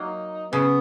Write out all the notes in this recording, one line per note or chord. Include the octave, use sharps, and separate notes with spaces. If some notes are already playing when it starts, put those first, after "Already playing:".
Already playing: F#3 A#3 D#4
C#3 B3